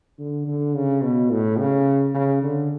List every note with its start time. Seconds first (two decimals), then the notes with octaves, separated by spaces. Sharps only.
0.19 D3
0.47 D3
0.75 C#3
1.03 B2
1.31 A2
1.59 C#3
2.14 C#3
2.43 D3